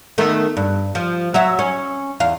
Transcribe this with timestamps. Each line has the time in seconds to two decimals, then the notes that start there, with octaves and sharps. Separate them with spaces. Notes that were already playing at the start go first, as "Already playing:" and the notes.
0.18 D#3 A3 B3
0.57 G2
0.95 F3
1.34 F#3 C#5 E5
1.59 C#4
2.20 E2 F5